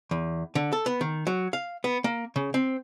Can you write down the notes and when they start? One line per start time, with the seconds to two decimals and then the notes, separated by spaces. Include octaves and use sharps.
0.11 E2
0.55 D3
0.73 A4
0.86 B3
1.01 D#3
1.27 F#3
1.53 F5
1.84 B3
2.04 A#3
2.36 C#3
2.54 C4